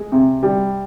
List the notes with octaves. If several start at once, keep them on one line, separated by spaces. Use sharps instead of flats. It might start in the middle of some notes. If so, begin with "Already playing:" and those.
Already playing: G#3
C3
G3